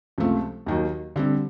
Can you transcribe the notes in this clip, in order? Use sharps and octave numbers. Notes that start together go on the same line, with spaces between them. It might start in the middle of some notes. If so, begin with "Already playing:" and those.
C#2 C3 F3 A3
D#2 D#3 F#3
D3 G3 C4